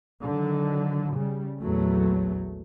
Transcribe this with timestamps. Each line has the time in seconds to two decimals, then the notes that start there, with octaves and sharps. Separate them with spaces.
0.23 D3 D#3 F#3
1.13 C#3 G3
1.61 A#1 E2 F#3 A3